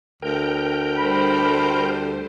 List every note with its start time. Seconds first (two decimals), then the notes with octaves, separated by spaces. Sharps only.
0.22 D2 A#4 G5
0.98 D3 G3 C5 B5